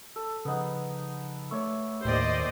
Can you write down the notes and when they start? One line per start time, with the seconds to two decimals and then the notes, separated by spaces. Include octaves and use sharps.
0.16 A4
0.45 C#3 F3 B3 D#4 F#5
1.51 A3 C#5 D5 E5 C#6
2.05 D#2 A2 G4 C5 D5 D#5